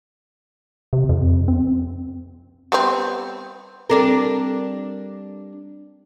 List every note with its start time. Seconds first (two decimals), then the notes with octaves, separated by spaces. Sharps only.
0.93 C3
1.09 F2
1.48 C4
2.72 G3 B3 C4
3.90 G3 C4 D4 A4 A#4